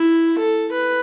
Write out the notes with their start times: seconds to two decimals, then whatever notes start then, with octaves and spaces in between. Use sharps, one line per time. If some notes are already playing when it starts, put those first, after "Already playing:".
Already playing: E4
0.38 A4
0.72 B4